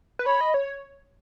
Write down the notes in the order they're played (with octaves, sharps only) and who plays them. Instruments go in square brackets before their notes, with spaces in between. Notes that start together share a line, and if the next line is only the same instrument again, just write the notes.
[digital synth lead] B4
[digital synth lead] C#5 [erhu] B5
[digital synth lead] D#5
C#5